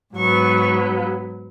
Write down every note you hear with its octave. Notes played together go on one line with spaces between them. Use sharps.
G#2 F#3 B3 C#6